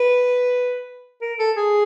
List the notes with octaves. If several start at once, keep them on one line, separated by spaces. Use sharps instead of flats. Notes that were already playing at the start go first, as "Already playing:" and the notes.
Already playing: B4
A#4
A4
G#4